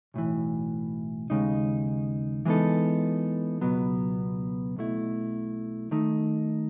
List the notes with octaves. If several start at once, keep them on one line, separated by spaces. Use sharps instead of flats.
B1 A2 E3
D#2 C#3 G#3 D#4
E3 G#3 B3 D#4 A4
C#2 B2 F#3 B3
B1 B2 A3 E4
D#3 A3 D#4